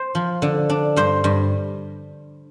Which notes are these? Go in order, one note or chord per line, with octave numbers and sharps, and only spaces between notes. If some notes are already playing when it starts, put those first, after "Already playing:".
Already playing: C5
F3
D3
D4
G2 C5
G2